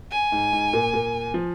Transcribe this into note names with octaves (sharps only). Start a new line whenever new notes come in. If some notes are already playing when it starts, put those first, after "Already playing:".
G#5
G#2
G#2
A#2
A#2
F3